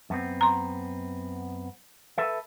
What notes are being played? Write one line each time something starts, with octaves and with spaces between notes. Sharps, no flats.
F#2 B3 C4
A#5 C6
A4 B4 E5